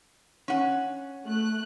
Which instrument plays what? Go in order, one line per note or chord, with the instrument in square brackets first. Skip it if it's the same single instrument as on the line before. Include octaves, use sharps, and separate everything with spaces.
[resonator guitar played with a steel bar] C#4 F#5
[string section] A3 F#6